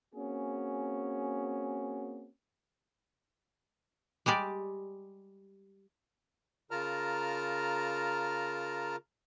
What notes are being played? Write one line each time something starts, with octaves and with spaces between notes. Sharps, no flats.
A#3 C4 C#4 F#4 G#4
G3 G#3 G4 D5
C#3 F4 A#4 A5 A#5 F6